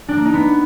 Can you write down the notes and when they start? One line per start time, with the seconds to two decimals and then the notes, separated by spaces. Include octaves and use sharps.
0.09 D4
0.17 A#3
0.25 D#4
0.34 B3